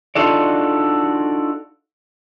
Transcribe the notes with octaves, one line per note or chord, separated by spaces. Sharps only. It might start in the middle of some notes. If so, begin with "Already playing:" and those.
D4 D#4 F4 F#4 A4 D5